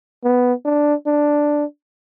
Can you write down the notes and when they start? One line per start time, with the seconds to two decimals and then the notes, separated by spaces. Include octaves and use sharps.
0.24 B3
0.65 D4
1.07 D4